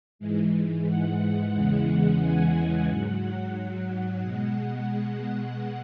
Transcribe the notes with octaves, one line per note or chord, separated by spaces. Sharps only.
G#2 E3 G#3
F#5
E2 C#3 E3 G#3
G#5
G#5
G#2 F#3 F#5
B2 G#3